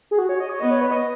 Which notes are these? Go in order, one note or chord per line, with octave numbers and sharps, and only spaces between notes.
G#4
F#4
C#5
D#5
C#5
B3 D#5
C#5
B4
D#5